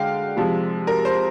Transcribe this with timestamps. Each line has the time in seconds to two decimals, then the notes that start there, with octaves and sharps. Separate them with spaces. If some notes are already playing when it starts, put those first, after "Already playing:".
Already playing: D3 G#3 F5 G5
0.37 C3 F3 G#3
0.87 A#4
1.05 C5